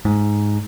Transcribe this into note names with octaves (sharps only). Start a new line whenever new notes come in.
G#2